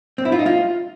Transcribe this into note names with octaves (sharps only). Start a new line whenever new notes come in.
C4
E4
F4
D#4
F4